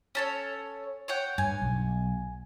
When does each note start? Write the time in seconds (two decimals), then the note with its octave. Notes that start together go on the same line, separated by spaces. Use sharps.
0.15 C#4 A4 C#5
1.08 C#5 F#5 G5
1.38 G2 G#5
1.62 B1